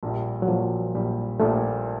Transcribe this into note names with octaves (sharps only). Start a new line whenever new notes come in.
A#1 A#2 G3
F#3
A#1 A#2 F3 G3
A#1 A#2 G3
A#1 A#2 G3 A3